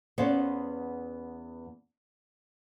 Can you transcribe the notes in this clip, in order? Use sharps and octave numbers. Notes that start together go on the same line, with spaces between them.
E2 B3 C#4 C5 F5 F#5